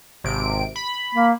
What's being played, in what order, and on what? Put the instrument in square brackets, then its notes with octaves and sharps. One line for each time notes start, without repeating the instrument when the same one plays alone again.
[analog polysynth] G#1 C3 D7
B5
[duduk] A#3